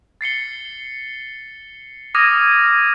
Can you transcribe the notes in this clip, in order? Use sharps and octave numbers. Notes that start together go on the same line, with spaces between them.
A6 C7 C#7 G7
D6 D#6 F6 G#6 A#6 D#7